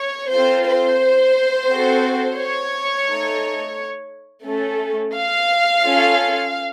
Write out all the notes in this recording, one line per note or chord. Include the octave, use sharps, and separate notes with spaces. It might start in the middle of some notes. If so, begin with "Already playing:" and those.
Already playing: C#5
C4 F4 A4 C5
C5
C4 F#4 A4
C#5
A3 D#4 A4
A3 C#4 A4
F5
C#4 F4 A4